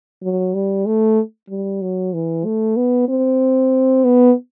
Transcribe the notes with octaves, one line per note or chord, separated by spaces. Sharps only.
F#3
G3
A3
G3
F#3
E3
A3
B3
C4
B3